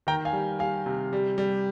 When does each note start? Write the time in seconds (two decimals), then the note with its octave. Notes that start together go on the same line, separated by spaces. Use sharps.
0.07 D#3 G5 A#5
0.25 F5 G#5
0.33 G3
0.59 G3 F5 G#5
0.86 C3
1.13 G3
1.38 G3